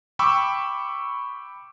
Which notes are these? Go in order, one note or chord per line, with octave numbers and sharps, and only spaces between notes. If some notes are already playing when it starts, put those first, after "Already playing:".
G5 B5 C#6 D6 E6